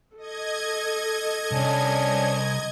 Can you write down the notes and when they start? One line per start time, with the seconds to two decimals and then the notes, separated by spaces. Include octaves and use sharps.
0.18 A4 D#5 G#6
1.51 C2 C#4 D4